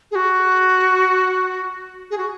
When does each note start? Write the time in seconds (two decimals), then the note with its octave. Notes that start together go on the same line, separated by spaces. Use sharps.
0.11 G#4
0.15 F#4
2.10 G#4
2.18 F#4